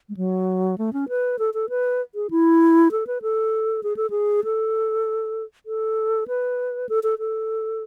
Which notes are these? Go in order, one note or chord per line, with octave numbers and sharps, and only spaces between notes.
G#3
F#3
A3
C#4
B4
A4
A4
B4
G#4
E4
A4
B4
A4
G#4
A4
G#4
A4
A4
B4
A4
A4
A4